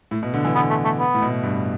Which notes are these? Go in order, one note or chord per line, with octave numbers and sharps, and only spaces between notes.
A2
B2
D3
E3
D3 B3
A3
A3
B3
A2
B2
A2
G2